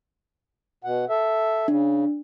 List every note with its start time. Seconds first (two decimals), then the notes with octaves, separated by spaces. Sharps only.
0.84 B2 F#5
1.09 A4 E5
1.68 C#3 D4